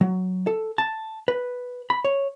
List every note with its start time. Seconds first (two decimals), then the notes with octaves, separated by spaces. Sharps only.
0.01 F#3
0.47 A4
0.78 A5
1.28 B4
1.90 B5
2.05 C#5